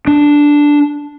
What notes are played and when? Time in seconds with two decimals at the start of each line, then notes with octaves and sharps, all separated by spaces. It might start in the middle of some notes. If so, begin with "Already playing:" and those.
0.07 D4